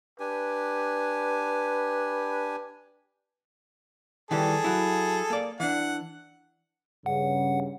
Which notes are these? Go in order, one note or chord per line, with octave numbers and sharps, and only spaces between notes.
D4 G4 B4 G#5
D#3 E3 G3 G#4 A4
F#3 E4
A#3 D5
E3 D4 F#5
G2 C#3 F#5